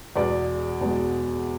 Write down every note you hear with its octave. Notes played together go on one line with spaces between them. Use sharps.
E2 B2 G#3 D5
E2 B2 G#3